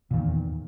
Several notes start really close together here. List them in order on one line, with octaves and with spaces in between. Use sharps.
A#2 D#3 E2